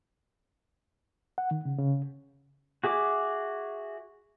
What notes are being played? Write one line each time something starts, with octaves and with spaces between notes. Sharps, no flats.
F#5
D#3
C#3
C#3
F#4 G#4 E5 D6